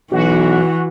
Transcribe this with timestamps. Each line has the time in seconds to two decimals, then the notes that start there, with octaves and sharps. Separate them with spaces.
0.12 B1 E3 F#4